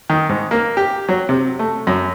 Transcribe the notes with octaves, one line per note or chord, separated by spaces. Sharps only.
D#3
G#2
A#3
G4
F#3
C3
A3
F#2